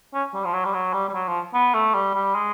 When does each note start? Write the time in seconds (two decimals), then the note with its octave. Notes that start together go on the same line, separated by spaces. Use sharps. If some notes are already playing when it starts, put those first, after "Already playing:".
0.14 C#4
0.34 G3
0.45 F3
0.54 F#3
0.65 G3
0.74 F#3
0.93 G3
1.09 G3
1.14 F#3
1.28 F3
1.54 B3
1.74 A3
1.94 G3
2.15 G3
2.35 G#3